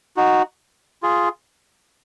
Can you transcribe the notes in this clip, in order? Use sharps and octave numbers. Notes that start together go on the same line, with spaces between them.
D#4 F#4
F4 G#4